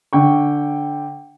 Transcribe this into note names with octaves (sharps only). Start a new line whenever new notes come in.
D3 G5 C#6